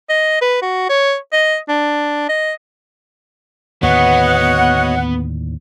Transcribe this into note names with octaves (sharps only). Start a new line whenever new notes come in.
D#5
B4
F#4
C#5
D#5
D4
D#5
D#2 A2 D3 B3 F#4 C#5 D#5 F#5